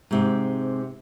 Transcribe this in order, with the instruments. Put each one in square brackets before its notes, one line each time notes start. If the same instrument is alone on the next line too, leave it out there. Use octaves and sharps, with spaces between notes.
[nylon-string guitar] G#2 C3